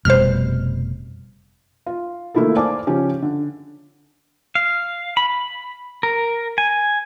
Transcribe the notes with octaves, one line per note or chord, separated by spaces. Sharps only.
F1 B2 G3 C5 F6
F4
D#3 A3 A#3 E4 F4 A4
C5 D5 F5 G#5 A5 D6
C#3 F3 C#4 G4
D3
F5
B5
A#4
G#5